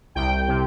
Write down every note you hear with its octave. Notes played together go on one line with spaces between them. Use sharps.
C2 G5
C3